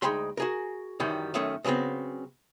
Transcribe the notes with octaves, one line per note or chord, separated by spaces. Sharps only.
D2 G#3 D#4 G5 B5 C6
F#4 G#4 A#4
F#2 D#3 E3 F#3 G3
F#2 D#3 A3 C#4
C#3 F#3 G#3 B3 C4